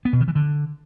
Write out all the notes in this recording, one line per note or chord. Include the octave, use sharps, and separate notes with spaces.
B3
B2
D#3
E3
D3